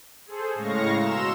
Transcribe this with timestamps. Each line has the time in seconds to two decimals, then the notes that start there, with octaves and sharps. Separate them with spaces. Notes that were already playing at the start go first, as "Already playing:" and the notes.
0.26 G#4 A4 C5
0.55 A2 C#3 G#3 F5 C#6 A#6
0.98 B2 A#5 C6 E6 E7